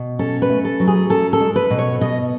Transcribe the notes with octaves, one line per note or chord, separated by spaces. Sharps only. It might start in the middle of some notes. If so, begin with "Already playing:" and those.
Already playing: B2
C#4 A4
B4
A3
A4
F#3
G#4
C#4 A4
A4
G#3
B4
B2
C#5
B2 D#5